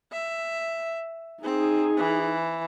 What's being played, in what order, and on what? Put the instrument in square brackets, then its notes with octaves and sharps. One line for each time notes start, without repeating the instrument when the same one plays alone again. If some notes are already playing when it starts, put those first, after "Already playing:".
[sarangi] E5
[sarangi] C4 [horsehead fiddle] D#4 G#4
[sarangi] E3